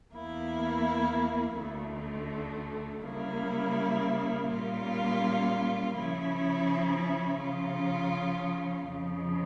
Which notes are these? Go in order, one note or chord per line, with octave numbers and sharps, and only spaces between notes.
E2 E3 A#3 E4
D2 D3 A3
C#3 G3 A#3 E4
A#2 G3 A#3 C#4 F4
C#3 F3 C#4 E4
C#3 F3 C#4 F4
F2 C#3 F3